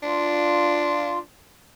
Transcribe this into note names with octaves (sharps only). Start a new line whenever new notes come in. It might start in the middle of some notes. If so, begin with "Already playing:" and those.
D4 F4